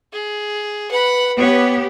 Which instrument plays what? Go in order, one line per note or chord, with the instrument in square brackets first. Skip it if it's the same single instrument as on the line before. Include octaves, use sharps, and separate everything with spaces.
[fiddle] G#4
[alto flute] B4 [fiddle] F#5 B5
[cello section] B3 G4 [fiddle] C#5